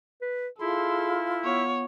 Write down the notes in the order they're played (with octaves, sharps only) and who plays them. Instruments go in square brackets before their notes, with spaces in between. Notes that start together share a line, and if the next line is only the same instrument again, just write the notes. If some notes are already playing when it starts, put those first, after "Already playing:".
[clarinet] B4
[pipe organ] E4 [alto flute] F4 [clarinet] G#4 [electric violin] A4 C6
[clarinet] B3 [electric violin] C#5